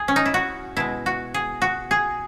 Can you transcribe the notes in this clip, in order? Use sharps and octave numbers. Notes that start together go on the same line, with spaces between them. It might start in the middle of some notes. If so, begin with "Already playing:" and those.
Already playing: G#4
C#4
D#4
E4
F#4
B2 G#3 E4
F#4
G#4
F#4
G#4